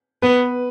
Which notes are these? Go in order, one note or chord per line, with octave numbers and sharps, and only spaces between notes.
B3 B4